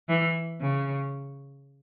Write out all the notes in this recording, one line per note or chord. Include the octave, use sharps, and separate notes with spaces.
E3
C#3